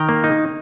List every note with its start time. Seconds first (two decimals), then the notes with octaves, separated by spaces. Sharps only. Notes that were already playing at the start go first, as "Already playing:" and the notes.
Already playing: D#3 G5 A#5
0.09 A#3
0.24 D#4